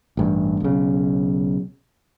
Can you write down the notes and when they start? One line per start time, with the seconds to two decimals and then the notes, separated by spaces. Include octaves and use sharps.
0.17 A1 G2
0.60 B1 C#3